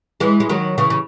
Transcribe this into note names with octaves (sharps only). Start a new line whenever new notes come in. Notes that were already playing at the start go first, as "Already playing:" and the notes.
E3 G#3
G#3
D#3 F#3
C#3 E3
C#3